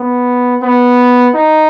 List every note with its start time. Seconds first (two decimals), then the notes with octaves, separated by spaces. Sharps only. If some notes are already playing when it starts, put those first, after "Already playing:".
Already playing: B3
0.63 B3
1.35 D#4